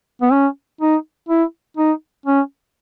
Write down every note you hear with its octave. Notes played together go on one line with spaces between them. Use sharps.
B3
C#4
D#4
E4
D#4
C#4